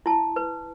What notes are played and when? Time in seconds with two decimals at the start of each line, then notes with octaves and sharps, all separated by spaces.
0.06 E4 A5
0.36 B4